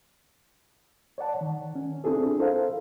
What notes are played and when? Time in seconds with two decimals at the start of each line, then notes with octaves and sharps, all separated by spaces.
1.18 C#5 D5 F#5 A5
1.41 D#3
1.75 C#4
2.04 C4 D4 E4 F4 G#4 A4
2.38 E4 A4 A#4 C5 F5